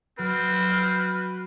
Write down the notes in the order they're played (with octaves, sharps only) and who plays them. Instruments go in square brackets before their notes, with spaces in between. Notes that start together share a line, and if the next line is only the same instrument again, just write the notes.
[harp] F#3 [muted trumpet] C4 [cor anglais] B4 [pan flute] F6